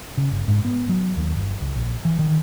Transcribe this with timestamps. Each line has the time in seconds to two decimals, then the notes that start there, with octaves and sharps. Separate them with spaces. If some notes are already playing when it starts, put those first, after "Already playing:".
0.17 C#3
0.31 G1
0.48 G#2
0.65 B3
0.89 F#3
1.17 D#2
1.35 G1
1.61 C#2
1.75 A#1
2.05 E3
2.19 D#3